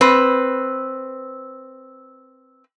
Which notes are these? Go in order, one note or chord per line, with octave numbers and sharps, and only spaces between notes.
C4 B4